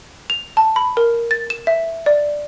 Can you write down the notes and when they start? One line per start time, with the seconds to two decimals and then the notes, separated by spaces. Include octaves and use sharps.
0.30 F7
0.57 A5
0.76 B5
0.97 A#4
1.31 A6
1.50 E7
1.67 E5
2.06 D5